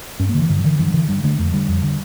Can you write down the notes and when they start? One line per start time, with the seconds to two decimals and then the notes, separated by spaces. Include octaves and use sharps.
0.20 G2 C#4
0.29 A#3
0.34 D3 E3
0.49 G2 D3
0.59 F3
0.64 D3 E3
0.79 G2 E3
0.87 F3
0.94 D3 E3
1.08 G2 G3
1.24 D3 A3
1.38 F2 A3
1.53 D3 G3
1.69 F2
1.83 D3